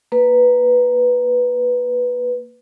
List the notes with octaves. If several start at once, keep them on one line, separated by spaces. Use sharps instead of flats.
A#3 B4